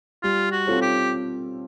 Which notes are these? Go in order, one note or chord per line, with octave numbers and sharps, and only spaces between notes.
G3 F4
F#4
C4 F4 A4 C#5
G4